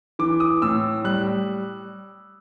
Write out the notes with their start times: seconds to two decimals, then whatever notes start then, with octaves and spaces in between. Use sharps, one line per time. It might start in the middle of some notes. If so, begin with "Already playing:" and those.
0.19 E3 D6
0.40 D#6
0.62 A2 E6
1.04 G3 F#6